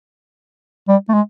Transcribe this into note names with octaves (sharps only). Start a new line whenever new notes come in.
G3
A3
G#3